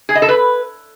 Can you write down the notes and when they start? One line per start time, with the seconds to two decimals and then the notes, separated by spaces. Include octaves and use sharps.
0.09 G#4
0.15 D#5
0.22 A4
0.29 B4